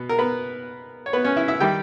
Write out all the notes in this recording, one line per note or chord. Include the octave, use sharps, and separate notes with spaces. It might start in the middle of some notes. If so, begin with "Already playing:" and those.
Already playing: B2 B3
A#4
B3 B4
C#5
B3 B4
C#4 C#5
E4 E5
E4 E5
D#3 G3 G4 G5